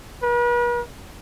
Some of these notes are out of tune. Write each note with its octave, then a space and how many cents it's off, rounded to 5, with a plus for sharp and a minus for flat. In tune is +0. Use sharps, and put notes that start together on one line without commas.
B4 -45